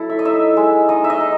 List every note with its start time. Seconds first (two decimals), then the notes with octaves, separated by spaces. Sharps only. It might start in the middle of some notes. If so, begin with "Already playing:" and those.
Already playing: F#3 E4 A4
0.10 E5
0.19 D#5
0.25 D#4 E5
0.57 G#3
0.89 D#4 D#5
1.04 E5
1.10 D#5
1.20 D#4